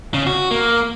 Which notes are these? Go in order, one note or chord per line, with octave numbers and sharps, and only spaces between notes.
C#3
F#4
A#3